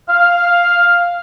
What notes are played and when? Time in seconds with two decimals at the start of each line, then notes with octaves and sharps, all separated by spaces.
0.09 F5 F6